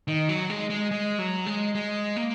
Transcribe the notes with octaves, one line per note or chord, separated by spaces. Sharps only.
D#3
F#3
G#3
G#3
G#3
F#3
G#3
G#3
A#3